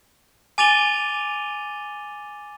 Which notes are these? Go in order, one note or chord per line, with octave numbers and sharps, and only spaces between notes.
G#5 D6 A6 D#7 F7 G7